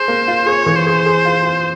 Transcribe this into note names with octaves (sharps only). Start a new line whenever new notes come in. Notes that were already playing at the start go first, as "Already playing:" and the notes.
Already playing: G#4 C5
A#3
F4
G#4 C#5
E3
C5
G#4
G#4
F4
F4